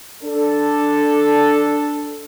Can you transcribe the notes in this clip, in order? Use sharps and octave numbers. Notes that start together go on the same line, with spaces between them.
D4 A4